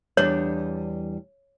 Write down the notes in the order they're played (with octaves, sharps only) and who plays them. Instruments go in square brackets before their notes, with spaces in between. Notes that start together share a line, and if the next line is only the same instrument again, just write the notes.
[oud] E2 G3 D4 [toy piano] C#5